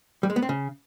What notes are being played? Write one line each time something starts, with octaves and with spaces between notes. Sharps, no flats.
G3
G#3
B3
C4
C#3